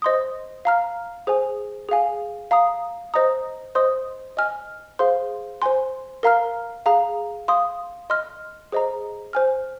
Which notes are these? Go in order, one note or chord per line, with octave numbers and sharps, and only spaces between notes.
C5 D#5 C6 D#6
F5 A#5 F6
G#4 C5 G#5
G#4 F5 G#5
F5 A#5 D#6
C5 D#5 A#5 D#6
C5 D#5 C6 D#6
D#5 G#5 F6
G#4 C5 F5 C6
C5 G#5 C6
A#4 F5 A#5 F6
G#4 F5 A#5
F5 C6 D#6
D#5 C6 F6
G#4 C5 D#5 A#5
C5 G#5 F6